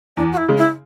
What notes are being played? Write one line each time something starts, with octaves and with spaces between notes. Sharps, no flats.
E2 D4
F#4
E4
C#3 G#3
E4